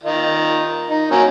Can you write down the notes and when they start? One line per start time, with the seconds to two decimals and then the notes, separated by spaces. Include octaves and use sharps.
0.04 D#3 D#4 F4
0.90 D#4
1.11 F#3 A#3 C#4